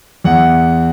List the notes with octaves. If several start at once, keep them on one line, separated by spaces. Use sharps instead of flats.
E2 F#5